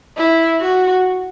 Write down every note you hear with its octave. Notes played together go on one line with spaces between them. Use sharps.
E4
F#4